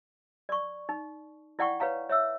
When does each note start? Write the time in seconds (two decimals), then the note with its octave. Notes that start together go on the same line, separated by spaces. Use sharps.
0.49 D5 C#6
0.89 D#4
1.59 E4 D5 F#5 G5 C#6
1.80 B4 C#5 F5 A#5
2.09 C#5 E5 E6